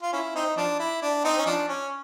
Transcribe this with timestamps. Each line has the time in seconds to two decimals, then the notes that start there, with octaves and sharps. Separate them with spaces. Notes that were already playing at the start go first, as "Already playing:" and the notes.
0.02 F4
0.13 C#4 E4
0.35 C4 D#4
0.57 F3 D4
0.79 E4
1.02 D4
1.24 C4 D#4
1.38 C#4
1.46 F3 D4
1.68 C#4